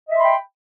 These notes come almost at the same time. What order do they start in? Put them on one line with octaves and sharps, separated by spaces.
D#5 E5 C6 B5 G5